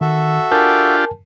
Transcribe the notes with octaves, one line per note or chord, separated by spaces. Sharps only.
D#3 F#4 A4 E5
D4 F4 G4 A#4 G#5 A5